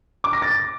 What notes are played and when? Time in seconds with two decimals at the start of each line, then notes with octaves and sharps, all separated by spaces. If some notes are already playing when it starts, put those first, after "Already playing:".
0.24 D6
0.33 A#6
0.42 A6